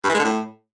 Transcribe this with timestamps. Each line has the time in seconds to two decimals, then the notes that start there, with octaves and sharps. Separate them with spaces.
0.04 G2
0.09 E3
0.15 G#3
0.20 D3
0.25 A2